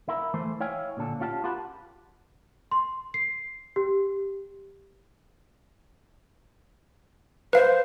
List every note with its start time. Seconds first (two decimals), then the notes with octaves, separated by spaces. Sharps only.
0.09 E4 A#4
0.34 E3 A3 C5
0.60 E4 C#5 F5 G5 G#5
0.97 A#2 D3 A4
1.20 C#4 F4 G4 F5 A5
1.44 F4 G4 A#4 F#5 A5 B5
2.71 C6
3.14 C7
3.76 G4
7.53 B4 C5 F5